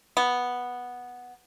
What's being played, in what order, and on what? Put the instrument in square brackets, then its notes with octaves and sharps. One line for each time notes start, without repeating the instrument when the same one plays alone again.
[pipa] B3